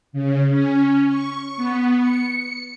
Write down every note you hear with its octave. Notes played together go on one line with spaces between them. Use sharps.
C#3
C#4
C#6
B3
C#7